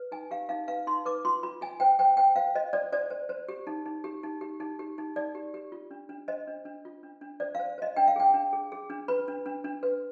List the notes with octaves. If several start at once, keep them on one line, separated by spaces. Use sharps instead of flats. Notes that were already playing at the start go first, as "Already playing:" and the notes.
Already playing: B4
D#4 G#5
G4 F5
D#4 F5
B4 F5
D#4 C6
B4 D6
F4 C6
F4 B5
F4 G#5
C5 G5
C5 G5
C5 G5
C5 F5
C5 D#5
C5 D5
C5 D5
C5
C5
G4
D#4
D#4
G4
D#4
G4
D#4
G4
D#4
D#4 D5
G4
G4
F4
D4
D4
C5 D#5
D4
D4
F4
D4
D4
C5 D5
F5
C5
C5 D#5
D4 G5
F5
G#4 G5
D4
G#4
G#4
D4
B4 B5
D4
D4
D4
B4